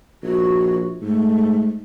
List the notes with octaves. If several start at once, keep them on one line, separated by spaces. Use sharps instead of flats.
A#1 F#4
G#2 A3